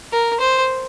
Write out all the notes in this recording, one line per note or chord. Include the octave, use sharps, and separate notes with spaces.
A#4
C5